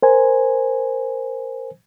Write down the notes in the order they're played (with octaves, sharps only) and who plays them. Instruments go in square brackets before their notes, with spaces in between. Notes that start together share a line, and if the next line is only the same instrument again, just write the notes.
[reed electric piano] A#4 C5 G#5